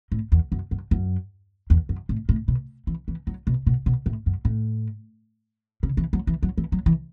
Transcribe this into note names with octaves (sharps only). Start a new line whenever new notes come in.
A2
E2
F#2
F#2
F#2
E2
F#2
A2
A2
B2
E3
E3
F#3
B2
B2
B2
A2
F#2
A2
C#3
E3
F#3
E3
F#3
E3
F#3
E3